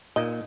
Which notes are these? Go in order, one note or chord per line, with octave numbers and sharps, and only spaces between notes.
A#2 D#4 D#5